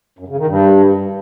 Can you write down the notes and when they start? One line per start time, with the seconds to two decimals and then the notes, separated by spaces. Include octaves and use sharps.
0.19 F#2
0.28 C#3
0.37 D#3
0.47 G2